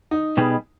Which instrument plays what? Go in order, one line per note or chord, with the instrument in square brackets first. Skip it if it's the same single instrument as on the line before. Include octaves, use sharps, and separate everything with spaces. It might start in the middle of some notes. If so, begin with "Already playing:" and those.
[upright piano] D#4
[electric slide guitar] B2 G3 B3 D#4 G#4